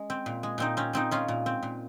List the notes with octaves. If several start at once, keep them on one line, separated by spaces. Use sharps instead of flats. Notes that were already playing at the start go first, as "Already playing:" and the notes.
Already playing: G#3 C#4
C4
A#2
G#3
A#2 C4 D#4
C4 C#4
A#2 C4 D#4
G#3 C#4 F4
A#2
C4
A#2